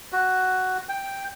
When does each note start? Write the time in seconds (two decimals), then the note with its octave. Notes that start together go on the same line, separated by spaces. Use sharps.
0.13 F#4
0.89 G5